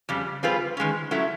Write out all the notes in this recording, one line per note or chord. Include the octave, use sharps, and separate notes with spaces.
F2 C#3 G3
G3 C4 F4 G#4 B4
D#3 G#3 C#4
F#3 A3 C#4 E4